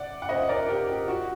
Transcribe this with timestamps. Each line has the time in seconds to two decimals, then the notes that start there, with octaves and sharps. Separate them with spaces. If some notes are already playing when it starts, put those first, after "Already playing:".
Already playing: D5 F#5
0.22 F#5
0.29 C5 D#5
0.49 A#4 D5
0.69 G4 A#4
0.88 G4
1.08 F#4